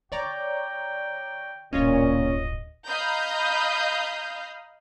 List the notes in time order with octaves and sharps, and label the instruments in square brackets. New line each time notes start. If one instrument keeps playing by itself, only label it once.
[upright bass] D3 [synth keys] C#5 D5 A#5 [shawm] G5
[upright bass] D1 G1 [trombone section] A#2 [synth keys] C#4 F4 C#5 [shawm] D#5
[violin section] D#5 F5 A#5 B5 D#6 G6